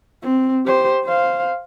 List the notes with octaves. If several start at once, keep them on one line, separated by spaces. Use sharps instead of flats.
C4
G4 C5
C5 F5